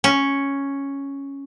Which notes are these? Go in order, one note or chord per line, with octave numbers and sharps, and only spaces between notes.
C#4